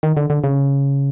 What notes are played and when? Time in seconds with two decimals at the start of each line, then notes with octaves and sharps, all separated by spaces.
0.03 D#3
0.17 D3
0.30 D3
0.44 C#3